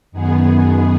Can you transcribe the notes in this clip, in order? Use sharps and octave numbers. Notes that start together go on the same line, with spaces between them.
F#2 D#3 B3 G#4